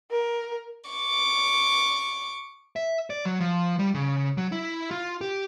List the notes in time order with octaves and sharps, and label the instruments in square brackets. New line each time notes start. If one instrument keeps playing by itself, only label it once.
[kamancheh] A#4
[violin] C#6 D6
[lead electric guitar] E5
D5
F#3
F3
G3
C#3
F#3
E4
F4
G4